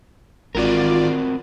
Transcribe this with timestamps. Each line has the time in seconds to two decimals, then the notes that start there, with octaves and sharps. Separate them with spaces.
0.55 G#1 C4 F4 F#4 A#4 D5